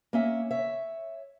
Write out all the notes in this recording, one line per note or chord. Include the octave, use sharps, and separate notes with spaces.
A#3 C#4 E5
C#5 E5